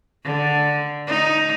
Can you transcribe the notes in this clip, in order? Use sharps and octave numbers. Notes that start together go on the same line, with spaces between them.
D3
D#4